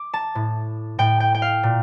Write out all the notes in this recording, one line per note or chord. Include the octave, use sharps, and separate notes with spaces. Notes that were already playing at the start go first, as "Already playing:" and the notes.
Already playing: D6
A5
A2
A2 G5
G5
G5
F5
A#2